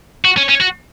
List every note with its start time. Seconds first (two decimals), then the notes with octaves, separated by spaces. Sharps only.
0.25 F#4
0.37 C#4
0.49 C#4
0.61 F#4